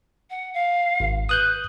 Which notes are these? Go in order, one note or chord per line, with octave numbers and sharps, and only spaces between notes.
F#5
F5
G#1
B4 D#6 F#6 G6